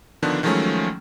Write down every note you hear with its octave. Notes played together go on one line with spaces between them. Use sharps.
D3 D#3 F3 B3 D4
D#3 F3 F#3 G#3 A3 C#4